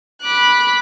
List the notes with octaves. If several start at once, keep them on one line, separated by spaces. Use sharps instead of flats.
B5 D6 F#6